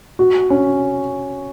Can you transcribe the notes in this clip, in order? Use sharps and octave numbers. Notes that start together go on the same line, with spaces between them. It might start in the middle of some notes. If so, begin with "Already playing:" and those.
F#4
C#4